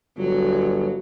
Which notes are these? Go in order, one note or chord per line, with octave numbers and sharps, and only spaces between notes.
G1 F#3